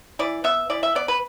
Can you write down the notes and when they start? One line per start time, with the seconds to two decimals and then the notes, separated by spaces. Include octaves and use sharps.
0.19 E3 D5
0.44 B3 E5
0.70 E3 D5
0.83 E5
0.95 B3 D5
1.08 B4